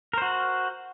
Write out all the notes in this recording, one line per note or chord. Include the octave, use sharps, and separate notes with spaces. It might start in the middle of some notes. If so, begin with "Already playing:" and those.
F#4 A#4 C5